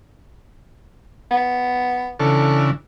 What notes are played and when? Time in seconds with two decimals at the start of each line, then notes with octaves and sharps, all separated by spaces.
1.31 B3
2.20 C#3 E3 D4 A4